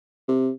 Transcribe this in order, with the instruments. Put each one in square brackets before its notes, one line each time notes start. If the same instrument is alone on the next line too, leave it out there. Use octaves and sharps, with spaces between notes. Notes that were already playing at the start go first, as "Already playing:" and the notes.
[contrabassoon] C3